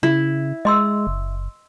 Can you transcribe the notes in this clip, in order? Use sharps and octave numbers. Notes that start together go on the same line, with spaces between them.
C#3 E4
G#3 D#5 C6 E6
F#1